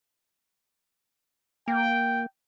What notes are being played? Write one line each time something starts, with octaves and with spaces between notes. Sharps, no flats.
A#3 G5